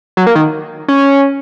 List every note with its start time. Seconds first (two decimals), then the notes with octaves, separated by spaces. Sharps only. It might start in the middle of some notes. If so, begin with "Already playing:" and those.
0.17 F#3
0.27 A#3
0.35 D#3
0.88 C#4